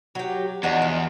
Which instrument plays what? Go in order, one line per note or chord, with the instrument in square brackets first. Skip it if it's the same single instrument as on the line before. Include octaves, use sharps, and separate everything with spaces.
[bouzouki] F#3 G4
[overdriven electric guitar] E2 [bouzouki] D4 D#4 F#4
[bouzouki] F3